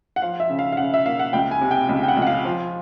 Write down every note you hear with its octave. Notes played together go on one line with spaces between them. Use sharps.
F#5
F3 F5
E5
C#3
F5
F5
C#3 F#5
E5
A#3 F5
F#5
C#2 G5
G#5
C3
G5
C#2
G5
F#5
C#2
F#5
F5
F3